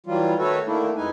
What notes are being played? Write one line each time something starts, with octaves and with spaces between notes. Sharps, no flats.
E3 F#3 G3 F4
D#3 A3 F#4 A4 B4 C#5
D3 D#3 A3 A#3 D4 E4
F2 G#3 D#4 E4 B4 G#5